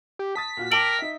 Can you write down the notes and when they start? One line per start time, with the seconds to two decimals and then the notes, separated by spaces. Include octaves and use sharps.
0.19 G4
0.36 A5 D#6 A6 B6
0.57 A#2 F4 F#4
0.71 A#4 G5 A5 D6 D7 F#7
0.99 D#4 E5